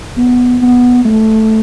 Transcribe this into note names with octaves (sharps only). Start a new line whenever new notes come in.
B3
B3
A3